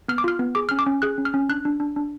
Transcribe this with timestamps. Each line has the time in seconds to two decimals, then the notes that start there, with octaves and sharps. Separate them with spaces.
0.08 B3 F6
0.18 D6
0.24 F4 F6
0.39 B3
0.55 G#4 D6
0.69 C#4 F6
0.79 D6
0.86 C#4
1.02 G#4 F#6
1.18 C#4
1.25 F6
1.34 C#4
1.49 D4 F#6
1.65 D4
1.80 D4
1.96 D4